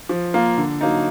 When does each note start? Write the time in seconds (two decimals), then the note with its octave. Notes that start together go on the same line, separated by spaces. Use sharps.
0.09 F3
0.34 A#3 F4
0.57 D3
0.81 F#3 A#3 D#4